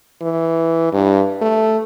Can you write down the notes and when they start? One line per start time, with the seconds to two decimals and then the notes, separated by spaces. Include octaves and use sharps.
0.21 E3
0.93 G2
1.41 A3